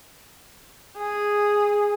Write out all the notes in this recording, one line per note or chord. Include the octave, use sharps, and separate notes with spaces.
G#4